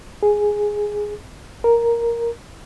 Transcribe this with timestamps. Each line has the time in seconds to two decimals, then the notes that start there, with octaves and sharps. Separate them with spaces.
0.23 G#4
1.64 A#4